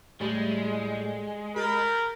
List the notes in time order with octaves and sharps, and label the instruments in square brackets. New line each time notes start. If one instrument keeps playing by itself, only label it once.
[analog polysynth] A2 [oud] G3 [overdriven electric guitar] G#3
[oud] G#4 [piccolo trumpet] A#4 [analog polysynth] B5 G6 A6